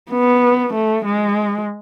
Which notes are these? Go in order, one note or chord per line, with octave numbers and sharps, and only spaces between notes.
B3
A3
G#3